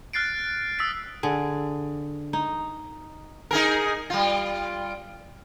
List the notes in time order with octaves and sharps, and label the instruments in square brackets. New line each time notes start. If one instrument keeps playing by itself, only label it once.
[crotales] F6 F#6 A6 C7 D7
D#6 E6 A6 B6 D7
[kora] D3 G#4
D#4
[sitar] D#4 G#4 A#4
G3 F4